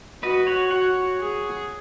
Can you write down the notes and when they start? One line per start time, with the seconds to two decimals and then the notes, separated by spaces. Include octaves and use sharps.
0.23 F#4 B4 D#5
0.47 C#5 F#5
0.71 F#4 C#5 F#5
1.20 G#4